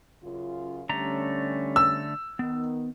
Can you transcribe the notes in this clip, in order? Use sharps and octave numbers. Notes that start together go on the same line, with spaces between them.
F#2 C#3 F4
D3 G3 A3 C#4 A#5
E6
D#3 B3